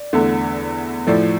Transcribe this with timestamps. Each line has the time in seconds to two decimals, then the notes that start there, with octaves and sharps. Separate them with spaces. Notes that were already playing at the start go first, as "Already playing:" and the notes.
Already playing: D5
0.13 E2 D3 A3
1.07 A2 F3 A3 D5